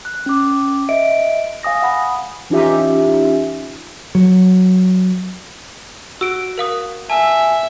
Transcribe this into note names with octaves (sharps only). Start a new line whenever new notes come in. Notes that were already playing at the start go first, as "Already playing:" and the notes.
F#6
C#4 D6
D#5 E5 D7
F5 G#5 D#6 A#6
F#5 B5 D#6
E3 C#4 D#4 F4 G4 E5
F#3
F#4 E6 D7
A#4 F5 D#6
E5 G#5 A5